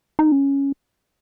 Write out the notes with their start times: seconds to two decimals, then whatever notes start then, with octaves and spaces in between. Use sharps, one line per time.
0.19 D#4
0.32 C#4